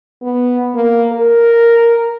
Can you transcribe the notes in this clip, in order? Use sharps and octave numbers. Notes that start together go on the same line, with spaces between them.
B3
A#3
A#4